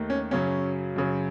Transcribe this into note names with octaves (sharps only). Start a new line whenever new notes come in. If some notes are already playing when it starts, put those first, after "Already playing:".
Already playing: D#2 D#3 A3
C#4
F#2 C#3 F#3 C#4
F#2 C#3 F#3